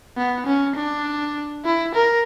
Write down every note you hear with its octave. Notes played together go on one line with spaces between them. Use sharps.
B3
C#4
D4
E4
A#4